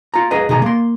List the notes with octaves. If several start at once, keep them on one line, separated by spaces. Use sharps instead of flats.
F4 A#5
G#4 B4 D#5 A#5
B2 D#3 G#4 A#5
A#3 C6